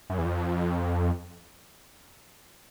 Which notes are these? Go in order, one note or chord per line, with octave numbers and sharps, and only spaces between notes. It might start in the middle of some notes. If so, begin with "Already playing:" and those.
F#2
E2
F2